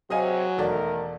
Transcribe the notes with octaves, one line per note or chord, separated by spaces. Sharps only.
C3 F#3 G#4 D#5 F5 G#5
E1 D#3 A3 A4 A#4 D5